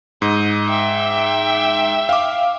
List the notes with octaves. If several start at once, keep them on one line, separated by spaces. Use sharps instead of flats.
G#2 D#5
E5 G5
F5 D6